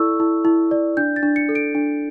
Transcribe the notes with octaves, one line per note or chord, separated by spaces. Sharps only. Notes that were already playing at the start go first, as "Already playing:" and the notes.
Already playing: E4 A4 D5 C#6 E6
E4
E4
D5
D4 G6
A6
D4
C#7
A4
D7
D4